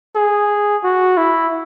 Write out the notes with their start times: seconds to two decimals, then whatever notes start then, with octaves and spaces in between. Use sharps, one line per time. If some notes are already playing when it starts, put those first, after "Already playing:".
0.16 G#4
0.84 F#4
1.17 E4